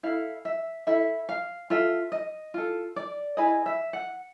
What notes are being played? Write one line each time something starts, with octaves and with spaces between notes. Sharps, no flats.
E4 A4 F5
E5
E4 A4 E5
F5
F4 A4 E5
D#5
F4 A4
D5
E4 G#4 B4 D#5
E5
F#5